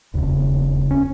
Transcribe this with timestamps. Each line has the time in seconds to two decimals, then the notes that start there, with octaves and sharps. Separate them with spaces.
0.14 E1 D#2 C#3
0.91 C#4